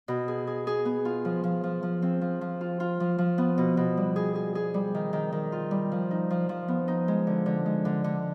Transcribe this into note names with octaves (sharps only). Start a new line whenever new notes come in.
B2
G#4
G#4
G#4
B3
F4
F3
F3
F3
F3
C4
F3
F3
F4
F4
F3
F3
B3
B2
B2
G3
G#4
G#4
G#4
G3
D#3
D#3
D#3
F4
G3
F3
D#4
F3
F3
B3
D#4
G#3
D3
D3
G#3
D3
D3